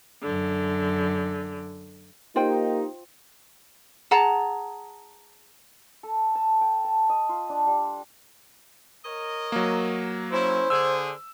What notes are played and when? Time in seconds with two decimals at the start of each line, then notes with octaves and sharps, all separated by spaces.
0.22 F#2 D3
2.36 A#3 D#4 F4 G4 C5 G5
4.11 G#4 F#5 A5 A#5
6.03 A4
6.35 A5
6.61 G5
6.84 A5
7.10 D#5
7.29 F4
7.49 D4
7.67 G3
9.05 A#4 C#5 D#5
9.52 F#3 A#3
10.32 C#4 E4 C5
10.70 D3 G#4 E6